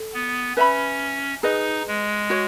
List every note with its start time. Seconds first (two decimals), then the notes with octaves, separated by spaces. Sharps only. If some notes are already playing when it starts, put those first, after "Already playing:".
Already playing: A4
0.14 B3
0.56 C#4 B4 E5 B5
1.43 D#4 G#4 B4 D#5
1.88 G#3
2.30 F#4 C#5